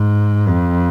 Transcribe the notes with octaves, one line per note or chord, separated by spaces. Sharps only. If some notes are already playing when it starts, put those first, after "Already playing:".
Already playing: G#2
F2